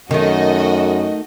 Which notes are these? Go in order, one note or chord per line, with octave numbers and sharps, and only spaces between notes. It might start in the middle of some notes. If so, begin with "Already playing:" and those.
F#2 D#3 A3 F#4 D#5